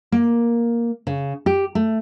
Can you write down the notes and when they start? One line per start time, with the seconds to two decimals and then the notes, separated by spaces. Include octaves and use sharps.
0.12 A#3
1.07 C#3
1.46 G4
1.75 A3